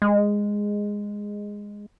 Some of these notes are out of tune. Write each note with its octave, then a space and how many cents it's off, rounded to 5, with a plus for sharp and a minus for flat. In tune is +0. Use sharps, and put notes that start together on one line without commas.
G#3 -10